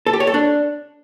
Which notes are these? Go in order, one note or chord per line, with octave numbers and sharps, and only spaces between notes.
A4
G4
C#5
A4
D4